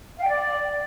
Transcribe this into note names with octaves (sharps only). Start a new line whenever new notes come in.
F5
G5
D5